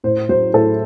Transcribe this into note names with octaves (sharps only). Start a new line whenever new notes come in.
A2 C5
F#3 C5
A2 A4